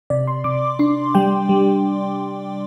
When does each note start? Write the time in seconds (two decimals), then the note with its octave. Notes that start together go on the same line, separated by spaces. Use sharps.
0.10 C3 D5
0.27 C6
0.44 C3 D6
0.79 D4 C6
1.15 G3 G5
1.49 G3